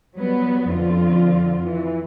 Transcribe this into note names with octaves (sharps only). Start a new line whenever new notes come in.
F#3 G3 B3
F2 D3 F4
E3